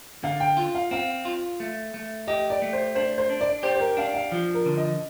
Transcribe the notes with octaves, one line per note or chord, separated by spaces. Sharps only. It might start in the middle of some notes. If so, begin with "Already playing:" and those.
D3 F5
G5
F4
F5
C4 F5
F4
A3
A3
G4 D#5
D5
A3
C5
D4 C5
C5
D4
D5
G4 C5
C5
A#4
D4 F5
F5
F3
A#4
D3
D#5